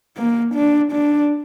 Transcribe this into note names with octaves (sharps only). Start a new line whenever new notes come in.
A#3
D4
D4